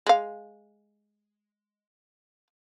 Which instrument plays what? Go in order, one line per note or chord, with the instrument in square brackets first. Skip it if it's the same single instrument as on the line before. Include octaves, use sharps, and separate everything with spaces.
[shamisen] G#3 F5